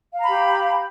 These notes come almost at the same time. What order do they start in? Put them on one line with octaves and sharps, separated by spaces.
F5 A#5 B5 G4